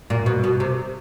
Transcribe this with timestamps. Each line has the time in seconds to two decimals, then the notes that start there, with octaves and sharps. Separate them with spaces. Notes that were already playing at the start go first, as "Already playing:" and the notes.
0.10 A#2
0.26 B2
0.44 B2
0.60 C3